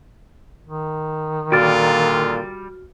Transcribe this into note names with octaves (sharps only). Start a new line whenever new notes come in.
D#3
A#2 D3 G3 F4 F#4 D5 F6